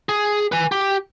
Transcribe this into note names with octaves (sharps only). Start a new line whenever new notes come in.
G#4
B4 G#5
G4